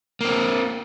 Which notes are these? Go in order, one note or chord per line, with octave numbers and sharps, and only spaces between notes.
A#3 C4